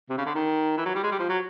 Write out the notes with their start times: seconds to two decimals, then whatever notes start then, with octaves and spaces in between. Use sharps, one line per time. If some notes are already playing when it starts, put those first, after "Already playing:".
0.10 C3
0.18 C#3
0.26 D3
0.35 D#3
0.78 E3
0.86 F#3
0.95 G3
1.03 G#3
1.12 G3
1.20 F3
1.29 F#3